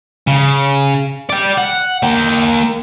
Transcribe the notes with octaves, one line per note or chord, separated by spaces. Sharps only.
C#3
D5 G5
F#5
A#3 G5